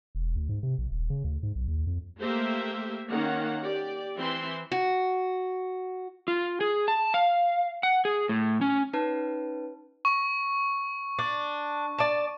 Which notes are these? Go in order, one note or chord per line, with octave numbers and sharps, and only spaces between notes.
E1
D2
G#2
C3
A#1
D#1
C#3
D2
G#2
B1
D#2
F2
A3 A#3 G4 C5 E5
D#3 A#3 C#4 F#5
G4 D5
E3 C4 E5 C6
F#4
F4
G#4
A5
F5
F#5
G#4
A2
C#4
C#4 D#4 B4 A5
C#6
D4
D5 A5